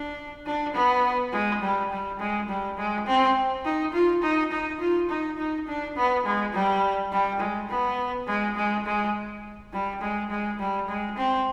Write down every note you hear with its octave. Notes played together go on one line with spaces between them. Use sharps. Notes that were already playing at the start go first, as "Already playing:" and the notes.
Already playing: D4
D4
B3
G#3
G3
G3
G#3
G3
G#3
C4
D#4
F4
D#4
D#4
F4
D#4
D#4
D4
B3
G#3
G3
G3
G#3
B3
G#3
G#3
G#3
G3
G#3
G#3
G3
G#3
C4